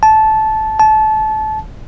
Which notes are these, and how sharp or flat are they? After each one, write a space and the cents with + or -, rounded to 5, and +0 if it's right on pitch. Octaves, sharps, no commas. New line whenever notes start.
A5 -15
A5 -25